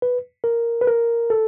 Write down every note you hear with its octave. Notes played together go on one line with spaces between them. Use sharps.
B4
A#4
B4
A#4
A4